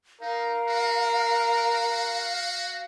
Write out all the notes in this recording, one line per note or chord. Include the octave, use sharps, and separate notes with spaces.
D#4 A#4 F5
F#4